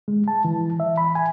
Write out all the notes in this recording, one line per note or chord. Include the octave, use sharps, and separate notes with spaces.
G#3
A5
E3
E5
B5
G#5